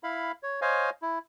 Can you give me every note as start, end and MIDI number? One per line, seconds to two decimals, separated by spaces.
0.03 0.32 64
0.03 0.32 77
0.03 0.32 83
0.43 0.61 73
0.62 0.90 72
0.62 0.90 73
0.62 0.90 75
0.62 0.90 77
0.62 0.90 80
1.02 1.19 64